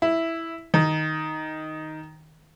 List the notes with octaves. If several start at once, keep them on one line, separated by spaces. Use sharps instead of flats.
E4
D#3